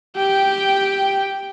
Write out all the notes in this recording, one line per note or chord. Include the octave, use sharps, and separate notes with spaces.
G4 G5